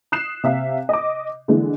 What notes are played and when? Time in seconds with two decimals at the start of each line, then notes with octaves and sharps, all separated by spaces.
0.12 D#6 F#6 C7 E7
0.44 C3 E5 F5
0.89 D#5 D6
1.48 D3 E3 G#3